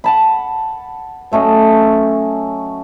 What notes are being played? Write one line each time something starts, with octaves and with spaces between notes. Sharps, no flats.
F#5 A5 B5
F#3 A3 C#4 D#5